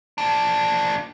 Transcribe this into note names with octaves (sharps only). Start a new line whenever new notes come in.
F3 D4